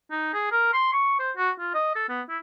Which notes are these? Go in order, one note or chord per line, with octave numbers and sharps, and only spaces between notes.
D#4
G#4
A#4
C6
C#6
C5
F#4
F4
D#5
A4
B3
E4